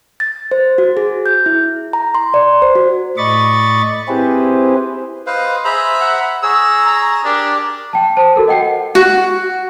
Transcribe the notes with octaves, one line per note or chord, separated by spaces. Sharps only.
A6
C5
F#4
G#4
G6
E4
A#5
C6
D5
C5
F#4
A2 D5 D#5 B5 C#6 A6
C4 E4 G4 G#4 B4 C5
B4 C5 D#5 F5
G#4 C5 E5 A#5 B5
F#5
G#4 C#5 A#5 E6
A#5
D4 G4 A#4 D5
G5 A5
C5 A5
F#4 A4 A#4
D#5 F#5 G5 C7
F#4